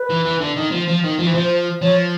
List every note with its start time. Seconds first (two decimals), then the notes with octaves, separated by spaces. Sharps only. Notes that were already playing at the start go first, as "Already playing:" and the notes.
Already playing: B4
0.10 E3
0.25 E3
0.41 D3
0.57 D#3
0.71 F3
0.88 F3
1.04 D#3
1.19 F3
1.27 E3
1.34 F3 C5
1.82 F3 C#5